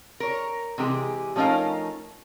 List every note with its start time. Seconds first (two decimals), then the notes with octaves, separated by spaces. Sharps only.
0.20 A#4 C#5
0.78 C3 E3 G#3 G4 G#4
1.36 F3 A3 C#4 D#4 A#4 F5